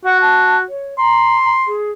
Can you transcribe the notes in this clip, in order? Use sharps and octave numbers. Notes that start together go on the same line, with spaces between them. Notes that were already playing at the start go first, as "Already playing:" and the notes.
F#4 F#5
A5
C#5
A#5 C6
G#4